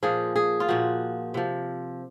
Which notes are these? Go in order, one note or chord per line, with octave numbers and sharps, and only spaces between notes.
A#2 F3 G#4
G#4
F4
A#2 F3 F#4
C3 F3